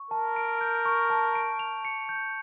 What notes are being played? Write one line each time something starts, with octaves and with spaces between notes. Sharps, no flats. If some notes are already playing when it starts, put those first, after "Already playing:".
Already playing: C#6
A#4 A5
D7
G6
C#6
A5
D7
F7
C#7
G6